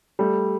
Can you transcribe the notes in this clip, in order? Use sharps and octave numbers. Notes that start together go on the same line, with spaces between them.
G3 A3